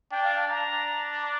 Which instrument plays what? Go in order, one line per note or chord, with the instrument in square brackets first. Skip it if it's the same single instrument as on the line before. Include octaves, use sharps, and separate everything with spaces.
[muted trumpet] D4 [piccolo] G5
[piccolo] F5
A5
[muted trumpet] D4 [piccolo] A#5
[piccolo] D6